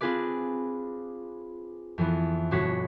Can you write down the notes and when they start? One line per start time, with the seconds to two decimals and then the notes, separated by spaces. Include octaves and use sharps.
0.01 C4 D4 F4 G#4 B4 D5
1.98 F2 E3 B3
2.51 G1 B2 D4 F#4 C#5 B6